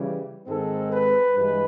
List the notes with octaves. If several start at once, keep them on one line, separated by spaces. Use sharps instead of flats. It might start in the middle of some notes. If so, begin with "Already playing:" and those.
Already playing: C#3 E3 G3
G#2 D#3 G#3 C4 A4
B4
G2 E3 G#3 B4